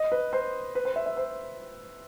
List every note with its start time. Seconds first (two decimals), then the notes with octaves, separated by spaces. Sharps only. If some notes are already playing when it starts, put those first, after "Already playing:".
Already playing: D#5
0.12 B4
0.33 C5
0.75 B4
0.85 C5
0.96 E5
1.06 E5
1.17 C5